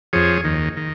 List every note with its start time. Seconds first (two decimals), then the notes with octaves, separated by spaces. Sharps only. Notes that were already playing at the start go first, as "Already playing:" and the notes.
0.13 F2 F3 G#4 C#5
0.44 D#2 D#3
0.77 D#3